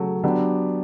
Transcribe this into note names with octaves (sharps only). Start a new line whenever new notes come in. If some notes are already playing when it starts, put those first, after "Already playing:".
Already playing: C#3 F#3 A3
F#3 B3 D4 G4